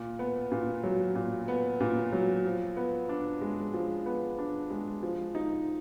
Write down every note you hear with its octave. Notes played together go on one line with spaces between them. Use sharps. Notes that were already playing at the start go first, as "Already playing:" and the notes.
Already playing: A#2
B3
A#2
F#3
A#2
B3
A#2
F#3
F3
B3
D4
G#3
F3
B3
D4
G#3
F3
D#4